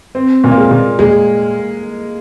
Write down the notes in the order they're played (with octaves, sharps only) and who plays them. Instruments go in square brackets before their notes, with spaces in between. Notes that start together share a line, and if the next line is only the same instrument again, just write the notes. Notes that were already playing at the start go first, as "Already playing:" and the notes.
[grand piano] C4
A#2
[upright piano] A#3
G#3
[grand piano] A#2
[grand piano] A#2 [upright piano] G#3